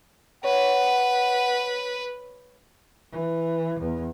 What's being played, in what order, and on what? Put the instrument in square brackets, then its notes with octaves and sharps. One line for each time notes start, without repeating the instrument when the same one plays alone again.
[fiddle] B4 [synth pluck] C#5 [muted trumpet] F#5
[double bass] E3
E2